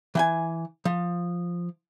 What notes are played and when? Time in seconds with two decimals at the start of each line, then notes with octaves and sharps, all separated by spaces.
0.15 E3 G5 G#5
0.85 F3